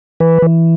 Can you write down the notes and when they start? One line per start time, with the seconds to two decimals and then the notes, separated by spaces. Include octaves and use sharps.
0.20 E3 B4
0.42 E3